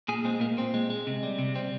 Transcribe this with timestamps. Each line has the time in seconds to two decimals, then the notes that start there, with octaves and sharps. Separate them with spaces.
0.08 A#2 G#4
0.25 G#3 C4
0.41 A#2 A#3
0.57 A#2 C4
0.74 G#3
0.90 G#3
1.07 C3
1.23 G3
1.39 C3
1.55 G3 C4